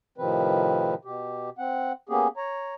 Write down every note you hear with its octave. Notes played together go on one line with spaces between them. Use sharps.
A2 C3 D#3 F3 C4 B4
B2 G4
C4 F#5
A#3 B3 C#4 G4 G#4
C#5 A#5